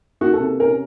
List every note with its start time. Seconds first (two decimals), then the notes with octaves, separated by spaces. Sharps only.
0.21 A#3 F#4
0.33 A4
0.40 C3
0.59 C#4 A#4